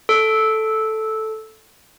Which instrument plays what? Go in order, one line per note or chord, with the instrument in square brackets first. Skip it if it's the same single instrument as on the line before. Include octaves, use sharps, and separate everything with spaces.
[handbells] A4